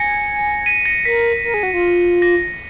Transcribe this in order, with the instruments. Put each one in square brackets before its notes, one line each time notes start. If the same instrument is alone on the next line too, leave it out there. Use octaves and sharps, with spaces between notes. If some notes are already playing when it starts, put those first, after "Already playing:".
Already playing: [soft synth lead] G#5 [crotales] A#6 C#7
[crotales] B6 D#7
A#6 C#7
[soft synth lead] A#4 [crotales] B6
[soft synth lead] A#4
G#4
F#4
F4
[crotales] A#6